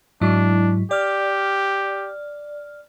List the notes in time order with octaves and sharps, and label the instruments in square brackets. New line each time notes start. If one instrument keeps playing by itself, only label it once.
[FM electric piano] G#2 F#3 E4 [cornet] D4
[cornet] G4 [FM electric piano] D5 F6